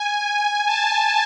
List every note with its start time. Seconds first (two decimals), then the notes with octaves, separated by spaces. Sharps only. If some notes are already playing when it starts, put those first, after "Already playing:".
Already playing: G#5
0.66 A5